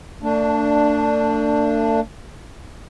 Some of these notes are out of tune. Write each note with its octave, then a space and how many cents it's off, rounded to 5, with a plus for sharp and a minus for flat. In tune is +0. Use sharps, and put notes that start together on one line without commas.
A3 +45 D4 +0